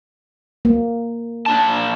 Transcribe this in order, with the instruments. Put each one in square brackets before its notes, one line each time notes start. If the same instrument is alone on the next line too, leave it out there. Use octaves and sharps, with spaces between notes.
[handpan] A#3
[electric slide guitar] A#2 D4 A5